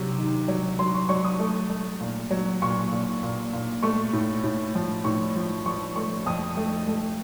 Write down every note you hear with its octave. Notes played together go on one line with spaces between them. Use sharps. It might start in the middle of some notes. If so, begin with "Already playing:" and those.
Already playing: C3 F#3
D#3
F#3
F#3 C6
C#6
F#3 C#6
D#6
A3
A3
A#2
F#3
A#2 C#6
A#2
A#2
A#2
A3 C#6
A2
A2
F3
A2 C#6
F3
F3 C#6
A3 C#6
F2 D#6
A3
A3